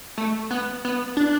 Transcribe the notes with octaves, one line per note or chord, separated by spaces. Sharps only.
A3
B3
B3
D4